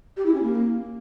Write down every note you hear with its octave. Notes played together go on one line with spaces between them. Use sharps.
G4
E4
C#4
A#3